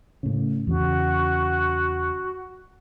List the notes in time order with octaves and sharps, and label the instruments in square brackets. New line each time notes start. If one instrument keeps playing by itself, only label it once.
[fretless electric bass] A2 C#3
[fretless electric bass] E2 C#3 [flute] F#4